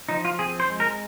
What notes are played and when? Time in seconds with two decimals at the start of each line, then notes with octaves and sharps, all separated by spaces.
0.09 F3 D#4
0.25 F4
0.39 C4 G#4
0.60 C5
0.70 G#3
0.80 A#4